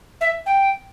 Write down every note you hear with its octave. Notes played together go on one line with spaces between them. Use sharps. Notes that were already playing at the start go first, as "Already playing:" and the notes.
E5
G5